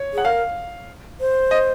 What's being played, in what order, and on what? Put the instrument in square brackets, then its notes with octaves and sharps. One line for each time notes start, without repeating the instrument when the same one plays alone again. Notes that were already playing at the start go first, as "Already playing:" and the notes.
Already playing: [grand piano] C#5
[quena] G#4 [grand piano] F#5
[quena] A#4 [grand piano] F5
[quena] C5
[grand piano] D#5